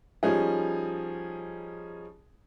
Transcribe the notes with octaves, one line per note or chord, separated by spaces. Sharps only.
F3 G3 C#4 D#4 G#4